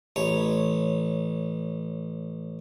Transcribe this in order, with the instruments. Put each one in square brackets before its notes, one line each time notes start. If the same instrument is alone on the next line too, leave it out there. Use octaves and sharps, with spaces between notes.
[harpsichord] A1 C#5